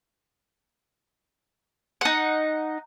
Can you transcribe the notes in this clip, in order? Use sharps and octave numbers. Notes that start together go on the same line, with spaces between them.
D#4 F#5